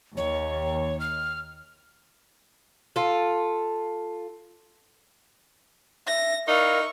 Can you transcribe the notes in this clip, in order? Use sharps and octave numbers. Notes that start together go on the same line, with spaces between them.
D#2 C#5
F6
F4 A4
E5 A#6
D#4 E4 A#4 D5 F5 C#6